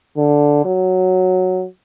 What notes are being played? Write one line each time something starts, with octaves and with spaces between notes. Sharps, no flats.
D3
F#3